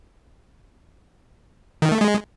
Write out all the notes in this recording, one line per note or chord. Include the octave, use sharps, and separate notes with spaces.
D#3
A3
G#3